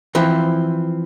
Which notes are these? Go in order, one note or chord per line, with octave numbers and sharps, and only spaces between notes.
E3 F3 C4 E4